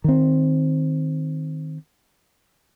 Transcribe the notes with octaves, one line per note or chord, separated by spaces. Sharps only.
D#3 C4